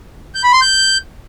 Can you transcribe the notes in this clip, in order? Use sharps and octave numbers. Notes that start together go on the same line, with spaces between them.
G6
B5
C6
G6